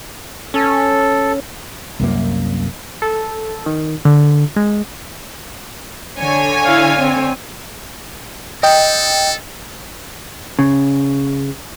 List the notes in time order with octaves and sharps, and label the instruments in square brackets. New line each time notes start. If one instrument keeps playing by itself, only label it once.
[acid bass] C#4 [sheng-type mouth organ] A4
[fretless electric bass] C2 F#2 A#3
[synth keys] A4
D#3
D3
G#3
[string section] D3 C#5 G#5
[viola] E4 F5
C4
[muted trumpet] A4 [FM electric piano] D#5 G5
[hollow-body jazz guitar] C#3